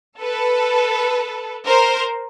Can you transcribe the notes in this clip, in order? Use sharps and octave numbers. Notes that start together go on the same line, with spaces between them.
A4 B4
A#4 C5